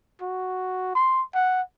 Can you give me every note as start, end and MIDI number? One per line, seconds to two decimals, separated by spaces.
0.21 0.90 66
0.95 1.22 84
1.34 1.62 78